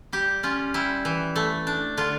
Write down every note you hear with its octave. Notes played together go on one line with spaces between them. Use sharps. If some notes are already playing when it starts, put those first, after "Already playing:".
G3 G4
C#4 F4
G3 E4
E3
A3
D4
D3 F4